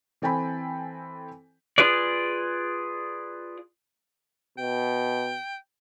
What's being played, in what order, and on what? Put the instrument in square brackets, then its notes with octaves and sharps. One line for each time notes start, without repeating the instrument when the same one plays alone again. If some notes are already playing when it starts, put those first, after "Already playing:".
[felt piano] E3 C4 A4 G5 G#5 B5
[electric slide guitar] F4 G#4 B4 D5
[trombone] B2 [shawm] G5